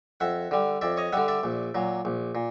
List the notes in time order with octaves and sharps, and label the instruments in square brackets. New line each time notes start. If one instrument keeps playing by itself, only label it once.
[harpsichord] F2 E5 F#5
D3 G3
F2 D5 E5
C#5 D#5
D3 G3 E5 F#5
D5 E5
A#1
A#2 F#3
A#1
A#2